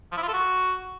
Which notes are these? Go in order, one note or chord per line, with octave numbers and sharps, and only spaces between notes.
F3
E4
F4
A4
F#4